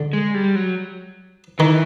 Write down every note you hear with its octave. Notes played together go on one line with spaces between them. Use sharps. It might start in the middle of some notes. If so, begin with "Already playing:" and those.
Already playing: D3
G#3
G3
F#3
D#3 E3